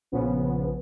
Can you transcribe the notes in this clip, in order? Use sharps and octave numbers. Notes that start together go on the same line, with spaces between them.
A#1 C#3 F3 B3